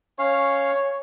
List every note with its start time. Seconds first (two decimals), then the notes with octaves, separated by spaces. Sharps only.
0.19 C#4 C#5 F5